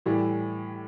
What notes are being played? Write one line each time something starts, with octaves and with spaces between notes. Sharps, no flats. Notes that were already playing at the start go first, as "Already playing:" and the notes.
A2 E3 G3